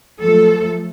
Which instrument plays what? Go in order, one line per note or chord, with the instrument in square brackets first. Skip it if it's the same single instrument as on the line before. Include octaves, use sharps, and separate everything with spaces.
[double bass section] F3 F#3 A3 [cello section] A4